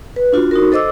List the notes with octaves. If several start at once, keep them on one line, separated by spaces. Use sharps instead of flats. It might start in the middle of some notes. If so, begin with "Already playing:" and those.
B4
D4 F4 F#4
D#4 F#4 A#4
A4 C5 D#5 D6 E6